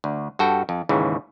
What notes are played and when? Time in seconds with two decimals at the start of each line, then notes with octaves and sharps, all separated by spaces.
0.04 D2
0.39 G2 F#4 A4 G5
0.69 F2
0.89 D#2 G#2 C#3 E3